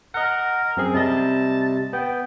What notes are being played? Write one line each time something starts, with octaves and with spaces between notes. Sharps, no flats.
A#4 D#5 F#5
F#2 C4 G#4
C3 G3 D#5 A5
B3 G5